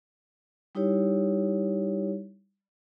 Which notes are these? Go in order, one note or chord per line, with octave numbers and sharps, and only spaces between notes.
G3 D#4 E4 G4 C#5